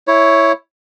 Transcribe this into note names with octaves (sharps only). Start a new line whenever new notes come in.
E4 C#5